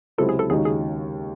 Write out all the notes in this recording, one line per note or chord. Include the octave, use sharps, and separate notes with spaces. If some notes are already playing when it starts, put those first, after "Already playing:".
C#2 C3 F#3 C4 E4 A4
G#4
A4
D#2 C#3 G#3 D#4 F#4 G#4
G#4